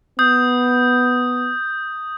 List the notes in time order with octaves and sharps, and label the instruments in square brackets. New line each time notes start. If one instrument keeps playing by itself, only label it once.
[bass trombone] B3 [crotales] D#6 G6